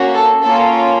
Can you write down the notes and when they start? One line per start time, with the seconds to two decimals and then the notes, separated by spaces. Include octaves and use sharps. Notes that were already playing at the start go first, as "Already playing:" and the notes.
Already playing: A#3 C#4 F#4
0.15 A4
0.43 A#3 C#4 F4 A4